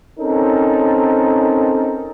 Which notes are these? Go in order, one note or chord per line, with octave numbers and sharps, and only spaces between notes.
C4 C#4 D#4 A4 A#4